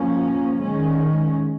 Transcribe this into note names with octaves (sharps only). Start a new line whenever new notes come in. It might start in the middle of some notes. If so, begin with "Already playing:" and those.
Already playing: F3 A#3 C#4
D#3 G#3 C#4